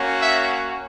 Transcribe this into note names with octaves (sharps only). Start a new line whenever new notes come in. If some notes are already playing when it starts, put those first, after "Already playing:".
Already playing: A#3 C#4 F#4
E5